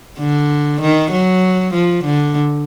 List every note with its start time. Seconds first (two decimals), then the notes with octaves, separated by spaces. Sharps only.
0.19 D3
0.81 D#3
1.12 F#3
1.74 F3
2.05 D3